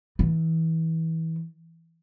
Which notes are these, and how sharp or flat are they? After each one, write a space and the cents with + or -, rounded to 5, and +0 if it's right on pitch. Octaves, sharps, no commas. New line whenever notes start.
E3 -25